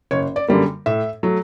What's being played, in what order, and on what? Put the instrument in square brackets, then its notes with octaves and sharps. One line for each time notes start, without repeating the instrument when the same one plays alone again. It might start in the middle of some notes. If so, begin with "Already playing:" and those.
[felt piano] F#1 C#5
D5
F#2 D3 G3 A#3
A2 E5
F#3 A3